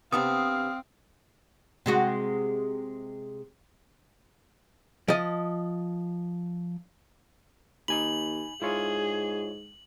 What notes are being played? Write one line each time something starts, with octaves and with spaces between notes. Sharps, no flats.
C3 B3 C4 D4 F5 D#6
C3 G#3 F#4
F3 D#5
D#2 D#4 G#5 B5 F#7
G#2 E4 F4 G#4 C#5